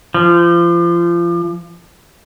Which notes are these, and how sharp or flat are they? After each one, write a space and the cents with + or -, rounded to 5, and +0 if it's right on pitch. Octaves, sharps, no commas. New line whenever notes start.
F3 -30